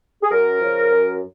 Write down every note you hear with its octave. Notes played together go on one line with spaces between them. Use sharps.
G#4
F#2 A#4
C#3 F3
F#2